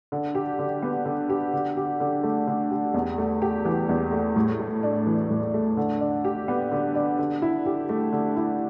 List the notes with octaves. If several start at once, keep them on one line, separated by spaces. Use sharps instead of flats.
D3
G4
D3
B3
D3
G4
D3
G4
D3
A3
D3
G4
E2
A3
G4
E3
E2
A3
A2
A3
D4
E3
A2
A3
D3
D4
G4
B3
D3
D4
D3
E4
G4
A3
D3
E4